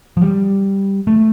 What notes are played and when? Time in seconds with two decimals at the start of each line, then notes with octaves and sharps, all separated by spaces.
0.17 F3
0.22 G3
1.07 A3